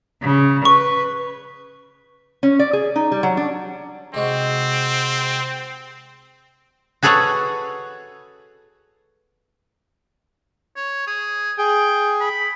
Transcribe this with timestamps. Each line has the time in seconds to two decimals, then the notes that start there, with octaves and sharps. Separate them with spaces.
0.22 C#3
0.65 B4 C#6
2.43 C#4
2.59 D5
2.73 G#4
2.96 D#4
3.12 G3
3.23 F#3
3.37 D4
4.14 C3 G#3 C4 F#4
7.03 F#4 G#4 A4 B4 C#5 F#5
10.76 C#5
11.07 G#4
11.58 G#4 G5
12.20 B5